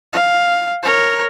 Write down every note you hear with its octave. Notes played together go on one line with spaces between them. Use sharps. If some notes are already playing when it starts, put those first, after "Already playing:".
F5
A#4 C#5